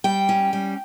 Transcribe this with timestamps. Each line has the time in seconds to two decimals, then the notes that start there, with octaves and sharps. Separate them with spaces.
0.04 G3 G5
0.29 C#4
0.53 G3